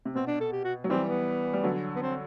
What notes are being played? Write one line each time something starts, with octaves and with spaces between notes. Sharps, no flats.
C3
B2 C4
D4
A4
G4
F#4
F#3
E3 G3 C4
B3
G3
D3 F#3
B3
C4